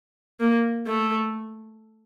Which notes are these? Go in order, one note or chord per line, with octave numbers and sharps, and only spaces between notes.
A#3
A3